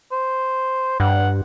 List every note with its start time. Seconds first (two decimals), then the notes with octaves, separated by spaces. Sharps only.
0.12 C5
1.00 G2 F#5